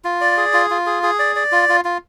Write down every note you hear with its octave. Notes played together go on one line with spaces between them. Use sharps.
F4
D5
G#4
F4
F4
G#4
G#4
D5
D5
F4
F4
F4